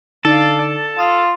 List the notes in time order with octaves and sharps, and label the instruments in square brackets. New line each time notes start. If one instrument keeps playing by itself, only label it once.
[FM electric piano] D3 D#4 [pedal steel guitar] A4 [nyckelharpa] D5 F5
[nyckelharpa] A5
[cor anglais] F4 [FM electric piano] D#6 F6